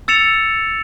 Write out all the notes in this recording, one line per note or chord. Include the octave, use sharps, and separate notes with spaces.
E6 A6 C#7 E7 F7